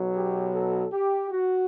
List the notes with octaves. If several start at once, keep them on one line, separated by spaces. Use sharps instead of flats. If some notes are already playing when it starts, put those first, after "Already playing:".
Already playing: B1 B2 F#3
G4
A4
G4
F#4